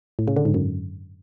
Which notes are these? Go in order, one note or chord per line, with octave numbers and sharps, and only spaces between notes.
A2
C#3
D3
G#2
F#2